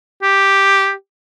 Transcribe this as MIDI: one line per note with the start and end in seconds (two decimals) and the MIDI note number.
0.23 0.92 67